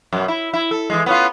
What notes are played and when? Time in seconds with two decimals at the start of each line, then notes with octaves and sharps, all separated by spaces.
0.13 F#2 B2
0.28 E4
0.53 E4
0.71 A4
0.90 E3 G#3
1.06 B3 C#4 F4